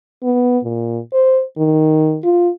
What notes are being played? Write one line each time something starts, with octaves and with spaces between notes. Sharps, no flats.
B3
A#2
C5
D#3
F4